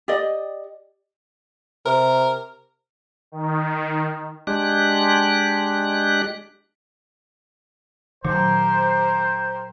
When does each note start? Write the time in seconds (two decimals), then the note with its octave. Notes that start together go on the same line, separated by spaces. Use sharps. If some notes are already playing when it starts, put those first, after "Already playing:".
0.08 G4 D5 D#5
1.86 C3 A#4
3.32 D#3
4.47 G#3 D4 G4 F#6
8.25 A#2 D#3 F#3 A3 G4 A#4 C5